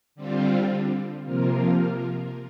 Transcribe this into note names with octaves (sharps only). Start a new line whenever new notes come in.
D3 G3 C4 F4
C3 F3 A#3 F4 A#4